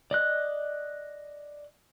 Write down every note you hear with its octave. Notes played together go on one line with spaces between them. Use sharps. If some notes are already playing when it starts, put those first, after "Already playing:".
D5 D#5 F#6